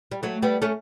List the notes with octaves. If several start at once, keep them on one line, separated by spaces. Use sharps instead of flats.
G3
F#3 A3
G3 B3
A3 C#4